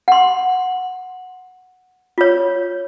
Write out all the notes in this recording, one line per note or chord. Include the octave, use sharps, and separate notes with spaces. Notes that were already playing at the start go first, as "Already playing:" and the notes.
F#5 C6
F4 C#5